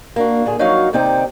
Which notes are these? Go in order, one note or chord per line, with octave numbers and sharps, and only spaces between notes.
A#3 D4 F#4
A#2 D3 G#4
F3 F#3 D#4 F#4 C#5 F5
D#2 C3 C4 D#4 D5 G5